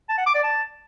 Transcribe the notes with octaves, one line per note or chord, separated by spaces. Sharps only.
A5
F#5
D6
D5
A5